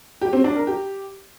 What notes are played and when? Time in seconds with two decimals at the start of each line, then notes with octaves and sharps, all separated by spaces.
0.21 G4
0.33 C4
0.44 D4
0.56 A#4
0.67 G4